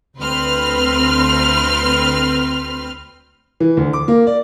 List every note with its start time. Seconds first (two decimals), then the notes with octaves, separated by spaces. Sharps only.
0.19 D2 C4 B4 C6 F6
3.60 E3
3.77 D2
3.93 D6
4.08 A#3
4.27 D5